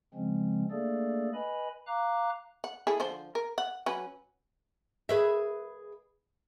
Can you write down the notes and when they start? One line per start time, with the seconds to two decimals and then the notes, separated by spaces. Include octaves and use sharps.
0.14 C#3 F3 G#3 C4 C#4
0.71 A3 A#3 D4 G#4 A4 D5
1.34 B4 D#5 G#5 B5
1.87 F5 A#5 D6 F#6
2.64 F#5
2.87 E4 G#4 A4
3.00 D3 F3 C5
3.35 A#4
3.58 F#5
3.86 F#3 C#4 B4
5.09 G#4 B4 E5